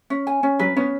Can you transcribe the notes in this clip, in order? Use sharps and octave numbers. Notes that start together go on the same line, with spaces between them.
C#4
G#5
C#4
F#3 B4
B3 C#4